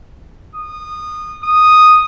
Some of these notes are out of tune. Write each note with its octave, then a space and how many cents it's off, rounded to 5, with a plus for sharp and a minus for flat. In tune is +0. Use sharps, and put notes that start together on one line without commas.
D#6 -20
D#6 -5